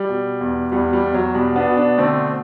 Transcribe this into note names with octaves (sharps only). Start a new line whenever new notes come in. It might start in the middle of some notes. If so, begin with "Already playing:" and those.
Already playing: G3
B2
E2
E2 G3
G3
E2
F#3
B2 G3
B3 D4
B2
B3 D4
D3 A3 C4